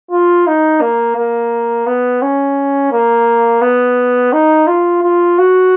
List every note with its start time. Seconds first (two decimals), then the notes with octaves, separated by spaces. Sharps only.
0.11 F4
0.47 D#4
0.81 A#3
1.17 A#3
1.87 B3
2.22 C#4
2.92 A#3
3.62 B3
4.33 D#4
4.67 F4
5.02 F4
5.38 F#4